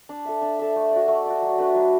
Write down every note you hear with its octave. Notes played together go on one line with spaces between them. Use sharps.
D4
A4 E5
D4
A4 E5
A3
F#4 D5
A3
F#4 D5
F#3
A3 D4 B4
F#3